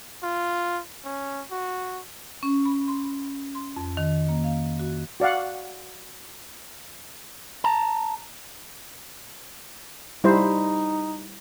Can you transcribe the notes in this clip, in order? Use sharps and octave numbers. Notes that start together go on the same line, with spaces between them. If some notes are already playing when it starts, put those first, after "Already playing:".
F4
C#4
F#4
C#4
B5
C6
B5
C6
F2
D#3
A#3
F5
F#4
F#4 D5 F5 F#5
A5 A#5
G3 D#4 E4 C5